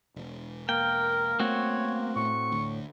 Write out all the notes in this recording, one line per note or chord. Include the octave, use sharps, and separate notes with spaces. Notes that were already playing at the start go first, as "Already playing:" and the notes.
E1
A#3 A#4 G5
A3 B3 C4 F#4 C#5
A2 C#6
D2